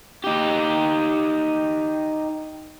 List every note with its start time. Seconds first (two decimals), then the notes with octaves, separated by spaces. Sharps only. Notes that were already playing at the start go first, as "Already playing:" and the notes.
0.24 D#4 G4